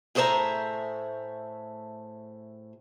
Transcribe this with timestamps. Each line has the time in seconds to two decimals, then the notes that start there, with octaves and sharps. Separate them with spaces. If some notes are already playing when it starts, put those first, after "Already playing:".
0.15 A2 A3 G#4 C5 E5 A#5